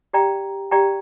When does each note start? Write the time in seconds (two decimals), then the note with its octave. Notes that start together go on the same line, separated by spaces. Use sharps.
0.13 G4 D5 G5 A#5
0.71 G4 D5 G5 A#5